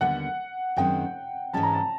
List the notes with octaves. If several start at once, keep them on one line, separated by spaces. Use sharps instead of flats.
D#2 D3 G3 B3 F#5
F#2 D#3 G#3 C4 G5
G#2 E3 G#3 C#4 A5
A#5
A5